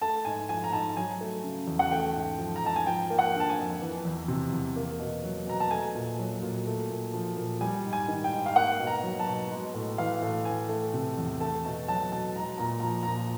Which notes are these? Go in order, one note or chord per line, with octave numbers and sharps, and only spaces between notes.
A3 A5
G#2 G#5
F3 G#5
A#5
G#2 A5
F#3 G#5
A3
C#3
E2
F#5
A3 G5
G#2
F3
A#5
G#2 A5
G#5
F3 G5
A#3
F#5
D3
A5
G#5
F2
E3
E2
C3
E2
A#3
B2
F#3
B2 A#5
A5
A3 G#5
A#2
F#3
A#2
A3
A#2
F3
A#2
G3 G#5
G#2
G#5
D#3
G5
G#2
F5
A#3 F#5
B2
A#5
F#3
A5
B2
G#3
A2
E3 F5
A2
E3 G#5
A3
C3
E2
A3 A5
B2 A5
F#3 A5
B2 A5
G#3 A#5
A#2 A#5
F3 A#5
A#2 A#5